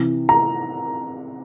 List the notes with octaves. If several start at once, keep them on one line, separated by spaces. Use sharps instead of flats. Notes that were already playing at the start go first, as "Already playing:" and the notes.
Already playing: C3 E3
A#5